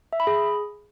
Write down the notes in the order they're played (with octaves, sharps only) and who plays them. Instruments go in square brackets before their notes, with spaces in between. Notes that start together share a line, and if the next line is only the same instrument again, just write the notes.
[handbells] E5
B5
G#4